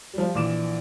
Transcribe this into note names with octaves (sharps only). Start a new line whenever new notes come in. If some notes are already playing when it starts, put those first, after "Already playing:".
F3 G3
A#1 E3 D6 E7